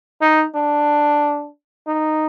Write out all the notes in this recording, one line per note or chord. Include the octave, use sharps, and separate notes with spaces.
D#4
D4
D#4